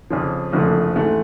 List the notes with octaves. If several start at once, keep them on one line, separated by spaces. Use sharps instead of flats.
F2 C#3 F3
F#1 F2 D3 F3 A3
G#2 E3 A3